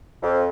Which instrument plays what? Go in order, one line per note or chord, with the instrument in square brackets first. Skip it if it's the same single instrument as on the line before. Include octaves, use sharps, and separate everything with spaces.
[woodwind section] F2